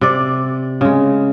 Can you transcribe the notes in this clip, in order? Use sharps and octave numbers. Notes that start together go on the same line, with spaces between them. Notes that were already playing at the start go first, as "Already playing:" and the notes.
C3 D5
C#3 G#3